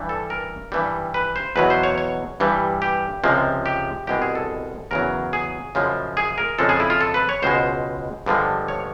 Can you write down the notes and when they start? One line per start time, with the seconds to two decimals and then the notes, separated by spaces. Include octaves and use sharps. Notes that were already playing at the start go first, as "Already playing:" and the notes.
Already playing: G2 E3 G3
0.09 A4
0.30 A#4
0.72 G2 E3 G3
1.14 B4
1.36 C5
1.56 E2 B2 F#3 B4
1.70 C5
1.83 C#5
1.98 C#5
2.40 G2 E3 G3
2.82 G4
3.24 C#2 C3 F3 G#3
3.66 G4
4.07 C2 B2 G#3 G4
4.22 G#4
4.35 A4
4.91 E2 C#3 F#3 A#4
5.33 G#4
5.75 F#2 C#3 F3 G#3
6.17 G#4
6.38 A#4
6.59 F2 C#3 F3 G#3 A4
6.69 G#4
6.80 E4
6.90 F4
7.01 A4
7.14 B4
7.29 C#5
7.42 C#2 B2 G#3 C5
8.26 G2 D3 F3 G#3
8.68 C#5